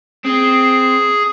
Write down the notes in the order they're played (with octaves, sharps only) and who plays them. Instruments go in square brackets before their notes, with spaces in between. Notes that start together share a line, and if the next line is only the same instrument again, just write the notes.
[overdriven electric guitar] C4 [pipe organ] G#4